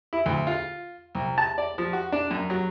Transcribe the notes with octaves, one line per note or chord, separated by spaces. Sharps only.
E4
D2
F4
C2
A5
D5
F3
F#4
D4
F#2
F#3